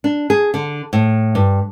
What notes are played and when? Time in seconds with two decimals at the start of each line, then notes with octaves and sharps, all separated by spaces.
0.04 D4
0.30 G#4
0.54 D3
0.93 A2
1.35 G2